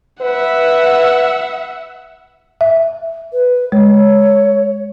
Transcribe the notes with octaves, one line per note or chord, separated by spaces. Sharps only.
B4 E5 F#5
E5
B4
G#3 C#5